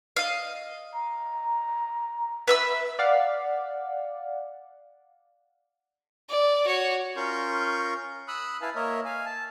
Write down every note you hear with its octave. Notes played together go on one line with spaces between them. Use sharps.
D#5 F5
A#5
B4 E5 E6
D5 F5 F#5
D5
F#4 C#5
C#4 F4 A#4 C6 C#6 G6
B5 D#6 E6 F#6
E4 B4 F5 G#5 A5
A#3 A#4 C#5 D#5 E5
F5 G#5
A5